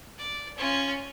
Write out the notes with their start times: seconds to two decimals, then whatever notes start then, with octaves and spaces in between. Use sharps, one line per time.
0.18 D5
0.58 C#4 F4